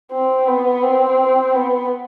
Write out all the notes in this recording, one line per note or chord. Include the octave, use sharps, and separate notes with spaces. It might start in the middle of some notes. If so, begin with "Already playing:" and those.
C4
B3
C4
B3